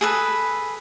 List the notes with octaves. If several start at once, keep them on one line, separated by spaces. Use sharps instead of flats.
G#4 A4 B4